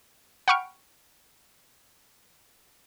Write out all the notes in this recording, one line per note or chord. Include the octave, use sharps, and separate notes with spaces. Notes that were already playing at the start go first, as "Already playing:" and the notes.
F#5 G5 B5 C#6 F6 D7